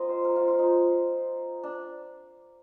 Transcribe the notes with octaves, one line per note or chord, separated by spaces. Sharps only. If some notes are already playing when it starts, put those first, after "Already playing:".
Already playing: C4 D#4 F4 D#5
C5
A#4
F4
F4
D#4
D4